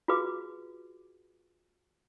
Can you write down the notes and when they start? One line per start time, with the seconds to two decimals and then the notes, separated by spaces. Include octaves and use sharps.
0.08 F4 F#4 G#4 B4 D6